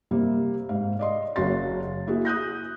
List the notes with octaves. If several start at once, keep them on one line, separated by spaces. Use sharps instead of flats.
C3 G3 A#3 C4
G#2 F5
D5 D#5 C6
F#1 C#3 F#4 C6 A6
A#3 E4 F#4 G#4 E5
D#6 F#6 G6 A#6